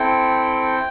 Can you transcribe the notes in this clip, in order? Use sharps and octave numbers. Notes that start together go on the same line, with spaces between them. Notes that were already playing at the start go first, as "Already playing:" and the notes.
Already playing: C4 E4 A4 G5